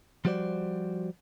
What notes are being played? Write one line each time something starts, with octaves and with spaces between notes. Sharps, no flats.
F3 G3 F#4 C5 D5